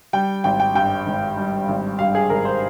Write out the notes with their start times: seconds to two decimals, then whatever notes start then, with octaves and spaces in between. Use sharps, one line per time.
0.13 G3 G5
0.44 G#1 G5
0.60 G5
0.75 G2 G5
1.06 G#1
1.37 G3
1.69 G#1
1.99 G2 F5
2.15 G#4
2.30 G#1 A#4
2.45 C5